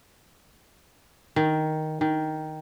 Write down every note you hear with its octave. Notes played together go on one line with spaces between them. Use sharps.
D#3
D#3